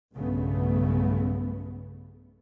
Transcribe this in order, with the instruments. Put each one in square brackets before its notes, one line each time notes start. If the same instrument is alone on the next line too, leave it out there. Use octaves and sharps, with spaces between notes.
[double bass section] B1 G2 C#3 A3 B3